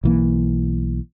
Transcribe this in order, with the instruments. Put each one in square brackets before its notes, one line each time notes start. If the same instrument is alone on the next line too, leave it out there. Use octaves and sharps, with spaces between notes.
[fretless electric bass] B1 E3 A#3